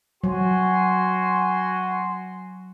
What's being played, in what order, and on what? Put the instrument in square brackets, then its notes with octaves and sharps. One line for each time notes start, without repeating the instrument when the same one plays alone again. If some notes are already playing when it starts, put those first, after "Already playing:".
[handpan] F#3 [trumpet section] F#4 G#5 C6